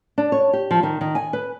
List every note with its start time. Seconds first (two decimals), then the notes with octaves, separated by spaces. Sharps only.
0.18 D4
0.32 C#5
0.53 G4
0.71 F3
0.83 D#3
1.01 D#3
1.15 G#5
1.33 B4